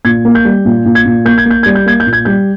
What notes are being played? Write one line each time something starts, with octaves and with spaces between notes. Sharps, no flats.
A#2 G#6
A#3
G6
G3
A#2
A#2
G#6
A#2
A#3 G6
G#6
A#3 G6
G3 G#6
G6
A#3 G#6
G6
A#2
G#6
G3 G6